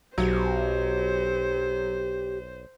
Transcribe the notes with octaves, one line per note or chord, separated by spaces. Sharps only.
B1 F#3 G4 C5